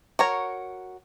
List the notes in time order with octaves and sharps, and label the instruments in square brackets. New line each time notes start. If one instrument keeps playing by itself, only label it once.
[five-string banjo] F#4 A#4 C#5